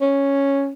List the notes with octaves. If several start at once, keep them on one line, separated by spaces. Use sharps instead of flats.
C#4